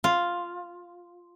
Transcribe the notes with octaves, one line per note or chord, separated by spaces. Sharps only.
F4